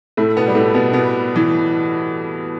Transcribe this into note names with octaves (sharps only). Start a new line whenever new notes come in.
A2 A3
B2 B3
G3
A2 A3
B2 B3
B2 B3
E3